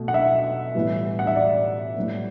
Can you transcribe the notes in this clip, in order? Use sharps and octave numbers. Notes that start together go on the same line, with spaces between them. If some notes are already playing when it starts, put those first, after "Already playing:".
Already playing: B2 A3
F#5
E5
A2 E3 G3 B3
F#5
E5
D5
A2 G3 B3